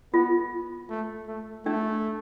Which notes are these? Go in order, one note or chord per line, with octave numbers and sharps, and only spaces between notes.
B3 F4
A3
A3
A3 D4